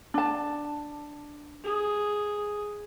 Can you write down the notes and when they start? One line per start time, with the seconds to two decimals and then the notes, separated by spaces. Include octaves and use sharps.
0.14 D4 A5
1.64 G#4